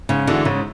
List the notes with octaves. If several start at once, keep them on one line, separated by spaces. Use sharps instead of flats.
G#2 C#3
D3 E3 G#3 D4 F#4
G#2 C#3